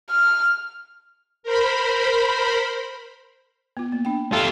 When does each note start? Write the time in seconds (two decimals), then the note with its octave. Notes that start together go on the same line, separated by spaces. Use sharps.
0.11 F6
1.43 A#4 C5 B5
3.77 B3 F4
3.92 A#3
4.05 D4 G5
4.33 F4 G4 A4 E5 A#5